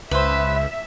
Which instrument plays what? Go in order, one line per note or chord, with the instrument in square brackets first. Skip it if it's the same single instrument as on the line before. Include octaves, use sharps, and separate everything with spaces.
[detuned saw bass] C#2 [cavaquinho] B4 C5 [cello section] E5